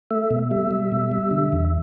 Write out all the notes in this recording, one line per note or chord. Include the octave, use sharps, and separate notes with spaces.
A3 E5
B2
G3 E5
G3
B2
G3
D3
E2